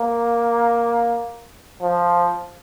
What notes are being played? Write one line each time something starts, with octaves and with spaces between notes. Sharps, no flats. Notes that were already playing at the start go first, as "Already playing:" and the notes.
Already playing: A#3
F3